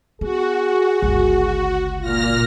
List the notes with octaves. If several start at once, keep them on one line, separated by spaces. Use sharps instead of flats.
B3 F#4 G#4
G1 C#2
A#2 F4 F6 A#6